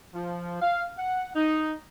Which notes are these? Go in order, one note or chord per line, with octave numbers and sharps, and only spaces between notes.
F3
F5
F#5
D#4